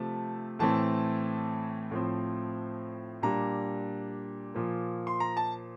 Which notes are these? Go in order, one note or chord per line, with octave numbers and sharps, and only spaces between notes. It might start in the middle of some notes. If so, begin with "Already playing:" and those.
Already playing: C3 F3 A3 A5
A2 E3 A3 C4 A5
A2 F3 C4
A#2 G3 D4 A#5
A#2 F3 A#3
C6
A#5
A5